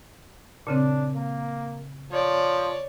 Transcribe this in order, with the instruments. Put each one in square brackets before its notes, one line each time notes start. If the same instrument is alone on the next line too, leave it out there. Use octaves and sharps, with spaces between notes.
[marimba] A#2 C#3 C4 [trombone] D4
[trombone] A#3
[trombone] F3 [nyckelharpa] C#5 D5